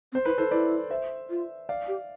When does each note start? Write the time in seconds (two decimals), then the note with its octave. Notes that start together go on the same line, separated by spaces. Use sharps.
0.12 C4
0.15 C5
0.25 E4 B4
0.38 E4 A4 C5
0.51 E4 B4 D5
0.90 C5 E5
1.30 F4
1.69 D5 F5
1.88 G4